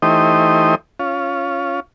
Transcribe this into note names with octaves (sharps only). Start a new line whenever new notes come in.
E3 A3 D#4 G4 C5 D#5
C#4 F4